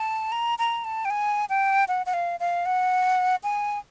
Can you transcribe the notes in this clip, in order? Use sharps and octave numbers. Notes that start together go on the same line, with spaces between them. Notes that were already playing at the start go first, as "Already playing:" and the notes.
Already playing: A5
A#5
A#5
A5
G5
G#5
G5
F#5
F#5
F5
F5
F#5
G#5